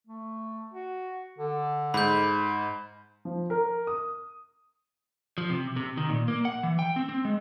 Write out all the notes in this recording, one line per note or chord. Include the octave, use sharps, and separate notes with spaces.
A3
F#4
D3
G#2 B5 G6
F3
A#4
D#6
F3
C3
C3
D#3
A#2
A#3
F#5
E3
G5
C4
C4
G#3